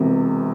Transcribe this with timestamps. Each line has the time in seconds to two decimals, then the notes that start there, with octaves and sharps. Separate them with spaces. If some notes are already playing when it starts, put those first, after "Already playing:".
Already playing: E1 E2 C3